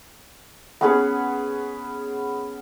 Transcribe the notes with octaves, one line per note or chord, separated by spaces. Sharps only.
B3 C#4 G#4 B4